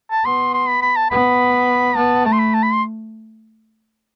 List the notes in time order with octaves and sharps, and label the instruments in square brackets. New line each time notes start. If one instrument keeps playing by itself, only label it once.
[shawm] A5
[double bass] B3 [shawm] C6
[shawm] C6
B5
B5
A5
[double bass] B3 [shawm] B5
[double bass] B3 [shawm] A5
[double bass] A3 [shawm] A5
[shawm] C6
B5
A5
B5
C6